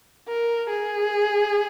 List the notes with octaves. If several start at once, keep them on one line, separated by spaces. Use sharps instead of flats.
A#4
G#4